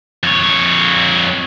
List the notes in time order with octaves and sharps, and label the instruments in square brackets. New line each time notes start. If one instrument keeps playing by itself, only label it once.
[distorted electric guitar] F2 C#5